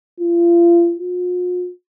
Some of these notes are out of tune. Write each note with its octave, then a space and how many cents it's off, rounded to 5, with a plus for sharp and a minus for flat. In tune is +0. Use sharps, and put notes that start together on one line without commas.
F4 -35
F4 +45